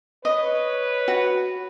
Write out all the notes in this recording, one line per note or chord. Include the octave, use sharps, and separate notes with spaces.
B4 C#5 D#5
F#4